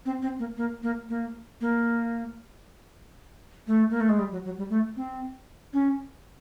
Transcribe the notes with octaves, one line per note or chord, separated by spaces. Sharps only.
C4
C4
A#3
A#3
A#3
A#3
A#3
A3
A#3
A3
G#3
G3
F#3
F#3
G3
A3
C4
C#4